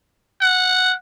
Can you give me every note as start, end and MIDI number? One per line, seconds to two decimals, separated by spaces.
0.41 0.94 78